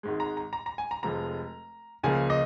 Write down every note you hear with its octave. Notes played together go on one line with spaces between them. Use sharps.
G#1 G#2 G#3
A#5
A#5
A#5
A#5
G#5
A#5
F1 F2 F3 G#3 A#5
C#2 C#3 F3 A#3 G#5
D#5